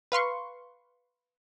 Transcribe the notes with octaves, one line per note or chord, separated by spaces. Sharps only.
B4 F5 C6 C#6